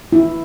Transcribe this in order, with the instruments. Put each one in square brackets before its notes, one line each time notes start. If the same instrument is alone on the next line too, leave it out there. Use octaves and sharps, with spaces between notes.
[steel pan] E4